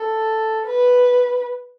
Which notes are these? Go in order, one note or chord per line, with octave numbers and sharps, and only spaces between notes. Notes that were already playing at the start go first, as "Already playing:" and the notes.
Already playing: A4
B4